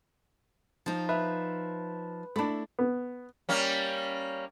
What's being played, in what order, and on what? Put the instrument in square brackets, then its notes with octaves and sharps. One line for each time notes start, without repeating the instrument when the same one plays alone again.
[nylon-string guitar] F3 D#4
[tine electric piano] B4 [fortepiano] E5
[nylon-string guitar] A3 E4 [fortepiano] D4 B5
[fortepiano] B3
[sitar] G3 A#3 C#4